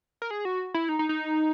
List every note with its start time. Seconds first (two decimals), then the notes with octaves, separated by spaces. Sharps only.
0.22 A#4
0.31 G#4
0.45 F#4
0.74 E4
0.89 D#4
0.99 D#4
1.09 D#4